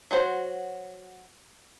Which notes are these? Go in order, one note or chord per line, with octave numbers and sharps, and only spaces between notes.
F#3 F#4 C5